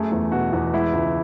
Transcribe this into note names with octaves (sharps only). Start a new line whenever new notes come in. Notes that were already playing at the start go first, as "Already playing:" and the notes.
Already playing: F#2 A3 G#4
E2
B2 F#4
E2
G#3 E4
C#2